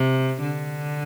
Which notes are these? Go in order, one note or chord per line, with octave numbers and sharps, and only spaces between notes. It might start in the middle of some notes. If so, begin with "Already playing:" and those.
Already playing: C3
D3